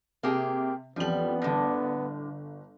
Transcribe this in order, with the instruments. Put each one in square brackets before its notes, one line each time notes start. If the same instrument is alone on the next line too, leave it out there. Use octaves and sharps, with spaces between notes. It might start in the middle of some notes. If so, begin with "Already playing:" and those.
[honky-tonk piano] C3 [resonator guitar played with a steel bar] A#3 G4 G#4
[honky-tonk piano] A1 F2 F#7 [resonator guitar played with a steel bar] F3 G3 [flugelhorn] B3
[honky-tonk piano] G1 A#6 [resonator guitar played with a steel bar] A2 D3